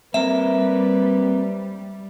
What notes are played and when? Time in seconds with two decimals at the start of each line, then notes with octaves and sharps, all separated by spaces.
0.14 G3 A#3 C4 A#4 B4 E5